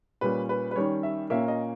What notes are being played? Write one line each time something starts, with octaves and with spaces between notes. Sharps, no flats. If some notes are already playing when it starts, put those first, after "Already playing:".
A#2 G3 C#4 B4
B4
B4
D#3 G3 C#4 C#5
E5
A#2 A#3 C#4 E5
D#5